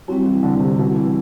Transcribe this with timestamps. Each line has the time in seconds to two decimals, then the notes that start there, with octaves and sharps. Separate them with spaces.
0.08 F#3 G3 C4 E4
0.26 E3
0.43 D3
0.55 D3
0.60 C3
0.78 B2
0.96 E3